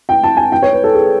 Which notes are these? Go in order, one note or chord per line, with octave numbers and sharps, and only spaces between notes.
G5
A5
G#5
G5
C#5
B4
A4
G#4